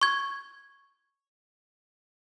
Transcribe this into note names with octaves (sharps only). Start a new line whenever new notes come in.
C#6 G#6